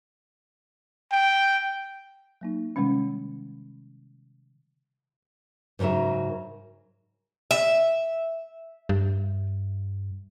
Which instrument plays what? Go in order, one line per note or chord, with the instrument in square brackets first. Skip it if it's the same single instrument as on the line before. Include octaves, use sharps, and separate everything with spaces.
[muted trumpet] G5
[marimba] F#3 A#3 D#4
C3 D#3 G3 G#3 C#4
[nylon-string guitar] G#2 C#3 F#3 A#4 E5
[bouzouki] E5
[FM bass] G2